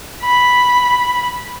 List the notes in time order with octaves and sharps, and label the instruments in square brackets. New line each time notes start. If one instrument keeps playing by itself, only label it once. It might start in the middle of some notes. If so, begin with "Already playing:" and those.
[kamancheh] B5